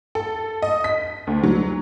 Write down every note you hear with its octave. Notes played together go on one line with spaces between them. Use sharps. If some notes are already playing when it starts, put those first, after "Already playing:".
A4
D#5
B6
D2
F#3